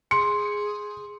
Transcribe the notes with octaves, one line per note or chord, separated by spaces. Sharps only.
G#4 C6 C#7